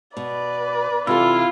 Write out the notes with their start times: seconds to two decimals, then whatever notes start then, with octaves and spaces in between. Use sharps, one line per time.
0.17 B2 B4 D5
1.07 C3 E3 E4 F4 A4